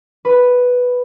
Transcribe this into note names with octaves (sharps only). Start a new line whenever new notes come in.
B4